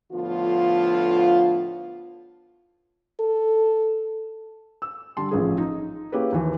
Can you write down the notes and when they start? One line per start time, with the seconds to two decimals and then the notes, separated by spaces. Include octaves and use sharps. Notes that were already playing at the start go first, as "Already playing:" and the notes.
0.12 A2 D3 F3 B3 F4
3.20 A4
4.82 E6
5.17 D3 G3 A5 C6
5.31 A1 F3 G#4
5.58 D#4
6.12 A#3 C#4 E4 G4 G#4 B4
6.32 D#2 E3